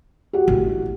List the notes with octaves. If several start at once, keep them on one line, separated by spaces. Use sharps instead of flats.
F#4 G4 F#5
A1